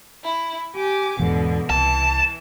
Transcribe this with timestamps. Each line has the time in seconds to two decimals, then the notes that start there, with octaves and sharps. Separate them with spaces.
0.25 E4
0.74 G4 G#5 D6
1.19 E2 G#2 B2 D3 E3
1.70 C2 E3 A5